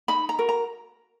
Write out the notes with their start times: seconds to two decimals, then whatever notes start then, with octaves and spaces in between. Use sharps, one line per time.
0.08 D#4 B5
0.29 A#5
0.39 F#4 A#4
0.49 A#5